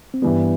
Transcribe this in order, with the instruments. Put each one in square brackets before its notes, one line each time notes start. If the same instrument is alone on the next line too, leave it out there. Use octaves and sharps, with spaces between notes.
[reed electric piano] C4
[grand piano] G2 E3 G3 [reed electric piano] B3